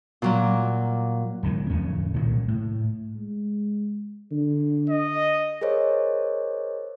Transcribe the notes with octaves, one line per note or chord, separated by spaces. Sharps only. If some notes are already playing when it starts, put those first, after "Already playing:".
A#2 F#3 A#3
D1 C#2 D#3 F#3
D1 F2 A2 C#4
C2 A#2 D#3 F#3
A2
G#3
D3
D#5
G#4 A#4 C5 C#5 D#5